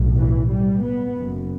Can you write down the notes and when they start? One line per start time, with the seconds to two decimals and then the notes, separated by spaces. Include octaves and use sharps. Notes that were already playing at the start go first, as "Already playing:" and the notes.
Already playing: B1 A2
0.17 E3
0.50 G3
0.83 B3
1.16 F#1 F#2